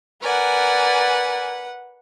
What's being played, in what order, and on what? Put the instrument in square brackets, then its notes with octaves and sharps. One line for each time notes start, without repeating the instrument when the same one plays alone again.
[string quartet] A#4 D5 G#5 [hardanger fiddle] B4 F#5